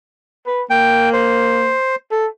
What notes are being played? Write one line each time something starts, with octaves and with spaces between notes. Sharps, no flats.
B4
A#3 G5
C5
A4